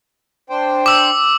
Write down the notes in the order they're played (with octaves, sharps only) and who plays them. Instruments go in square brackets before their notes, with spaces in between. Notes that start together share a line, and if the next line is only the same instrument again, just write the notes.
[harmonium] D4 C5 G5
[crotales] D6 E6